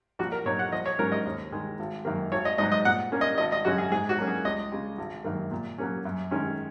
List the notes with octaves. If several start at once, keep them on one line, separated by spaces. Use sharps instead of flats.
A#1 F#4
A#4
A#2 F#3 D#4 C#5
F#5
A#1 D#5
C#5
G#2 F#3 C#4 A#4
D#5
D#2
D#3 G#3
G#1
F#2 D#3 A#3
G#1 C#5
D#5
G#2 F#3 D#5
D#5
A#2 F#5
A#3 C#4
D#5
G#1 D#5
D#5
F#2 C#3 G#3 C#4 F#4
G#4
G#2 G#4
F#4
F#3 A#3 C#4
G#4
C#2 D#5
C#3 G#3
G#1
F#2 D#3 A#3
A#2
F#3 A#3 C#4
F#2
D#3 G#3 C#4